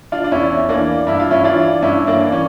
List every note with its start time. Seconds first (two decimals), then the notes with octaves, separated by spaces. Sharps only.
0.12 D4 F4
0.24 D4
0.31 E2 C#4 E4
0.69 E3 A#3 D4
1.07 G2 E4
1.20 F4
1.31 C#4 E4
1.44 E3 D4 F4
1.82 G2 C#4 E4
2.07 A#3 D4
2.20 E3
2.32 C#4